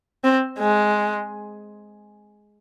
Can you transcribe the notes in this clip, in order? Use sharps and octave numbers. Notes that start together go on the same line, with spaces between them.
C4
G#3